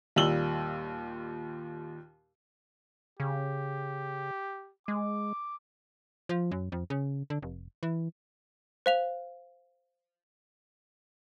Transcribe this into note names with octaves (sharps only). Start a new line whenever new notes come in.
D#2 A#2 G3 E6 F#7 G7
C#3 G4
G#3 D6
F3
F#2
F2
C#3
D3
F1
E3
C5 F5 F7